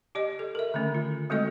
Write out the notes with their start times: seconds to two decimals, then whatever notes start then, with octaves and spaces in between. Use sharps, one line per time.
0.15 G4 D5 D#5
0.39 A4
0.55 A#4 E5
0.74 D3 D#3 A3 C#4
0.94 F4
1.30 G#3 A3 C4 F#4 A4 D#5